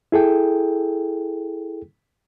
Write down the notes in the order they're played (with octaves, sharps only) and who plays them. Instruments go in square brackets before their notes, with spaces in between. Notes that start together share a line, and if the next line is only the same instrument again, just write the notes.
[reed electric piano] E4 G#4 A4 G5